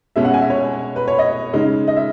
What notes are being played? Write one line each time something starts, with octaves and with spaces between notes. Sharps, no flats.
B2 G#3 C#4 E5
F#5
G#5
E5
C#5
B4
C#5
D#5
C#3 G#3 D#4
D#5
E5